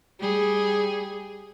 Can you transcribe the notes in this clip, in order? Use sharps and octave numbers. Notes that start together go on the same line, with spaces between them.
G3 G#4